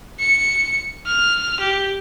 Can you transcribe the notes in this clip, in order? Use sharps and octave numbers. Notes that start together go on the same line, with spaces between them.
C#7
F6
G4